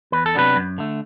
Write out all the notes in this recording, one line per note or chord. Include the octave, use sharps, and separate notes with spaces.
E2 B4
A4
C3 F#3 B3 D4 B4
F#2
D3 A3